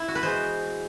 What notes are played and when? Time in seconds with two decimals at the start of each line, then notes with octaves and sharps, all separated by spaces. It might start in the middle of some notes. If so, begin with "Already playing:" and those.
Already playing: E4
0.08 F#4
0.15 B4
0.23 E3 G#3 B3 C5